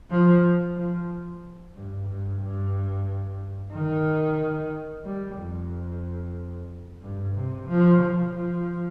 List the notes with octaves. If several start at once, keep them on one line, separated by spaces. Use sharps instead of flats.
F3
F3
G2
G2
G2
D#3
G3
F2
G2
C3
F3
F3
F3